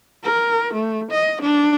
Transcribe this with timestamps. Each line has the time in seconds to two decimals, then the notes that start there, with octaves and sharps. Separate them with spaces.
0.24 A#4
0.73 A3
1.11 D#5
1.41 D4